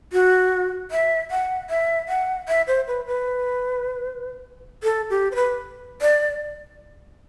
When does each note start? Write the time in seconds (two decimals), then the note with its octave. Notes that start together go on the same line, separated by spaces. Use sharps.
0.13 F#4
0.91 E5
1.31 F#5
1.70 E5
2.09 F#5
2.48 E5
2.67 C5
2.87 B4
3.07 B4
4.83 A4
5.10 G4
5.32 C5
5.35 B4
6.02 D5